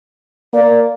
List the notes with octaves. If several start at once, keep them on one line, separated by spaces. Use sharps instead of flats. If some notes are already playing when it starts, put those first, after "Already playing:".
A#3 D5